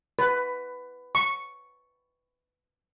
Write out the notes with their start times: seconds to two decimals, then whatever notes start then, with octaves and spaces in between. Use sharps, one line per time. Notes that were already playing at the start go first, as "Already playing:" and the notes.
0.19 B4
1.15 C#6